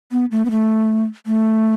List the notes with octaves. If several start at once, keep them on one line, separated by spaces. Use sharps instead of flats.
B3
A3
B3
A3
A3